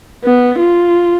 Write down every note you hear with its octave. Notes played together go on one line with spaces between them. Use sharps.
B3
F4